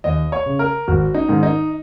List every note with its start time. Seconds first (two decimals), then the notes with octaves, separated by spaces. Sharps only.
0.04 D#2 D#5
0.32 C#5
0.46 C#3
0.59 A#4
0.88 G#1 F#4
1.14 D#4
1.28 G#2 D#3
1.43 D#4